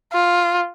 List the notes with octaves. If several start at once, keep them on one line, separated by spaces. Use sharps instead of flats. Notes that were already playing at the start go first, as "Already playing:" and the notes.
F4